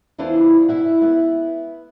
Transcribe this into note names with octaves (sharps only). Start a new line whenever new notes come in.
E2 E3 D4 E4 F4 C5
E4 E5 F#5
B3 F#5